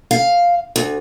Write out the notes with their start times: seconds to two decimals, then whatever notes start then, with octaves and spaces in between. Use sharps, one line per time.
0.11 F5
0.76 D2